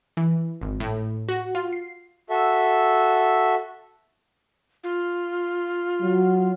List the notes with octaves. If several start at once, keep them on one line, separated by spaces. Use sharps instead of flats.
E3
G#1
A2
F#4
F4
C7
F#4 A4 E5
F4
F#3